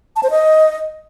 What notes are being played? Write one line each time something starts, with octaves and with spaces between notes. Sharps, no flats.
A5
C5
D#5